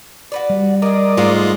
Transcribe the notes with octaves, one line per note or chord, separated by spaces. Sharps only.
F#4 B4 D5
G3
G#3 G#4 A#4 D5 D#5
G#2 G#3 A3 F4 G#4 C#5 F5